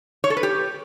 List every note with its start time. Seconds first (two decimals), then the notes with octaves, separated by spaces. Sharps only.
0.24 C#5
0.30 A4
0.37 B4
0.43 G4